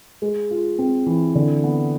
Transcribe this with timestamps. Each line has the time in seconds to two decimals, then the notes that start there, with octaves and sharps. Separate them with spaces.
0.22 G#3
0.51 F4
0.79 C4
1.06 E3
1.35 D3
1.64 B3